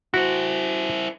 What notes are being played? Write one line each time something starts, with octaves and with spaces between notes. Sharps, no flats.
E4 F#4 C5